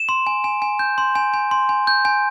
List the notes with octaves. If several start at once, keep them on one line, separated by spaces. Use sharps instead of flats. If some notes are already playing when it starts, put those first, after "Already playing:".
Already playing: E7
C6
G#5
G#5
G#5
G6
C6
G#5
G#5
C6
G#5
G6
G#5